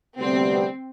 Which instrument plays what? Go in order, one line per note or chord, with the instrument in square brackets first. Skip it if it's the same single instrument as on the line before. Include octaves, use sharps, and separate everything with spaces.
[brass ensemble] D2 C3 G3 B3 [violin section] C4